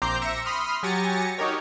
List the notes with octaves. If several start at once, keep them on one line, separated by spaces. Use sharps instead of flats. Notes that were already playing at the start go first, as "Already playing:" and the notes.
A#1 C4 A#5 D6 G6 C7
E5 A#6 C#7 E7
B5 C6 D#6 F6
F#3 G4 G#5 A6 A#6 C#7
D#4 F#4 G4 A#4 C#5